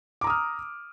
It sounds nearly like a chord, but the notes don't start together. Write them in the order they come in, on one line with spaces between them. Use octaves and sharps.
D6 A#5 D#6 F6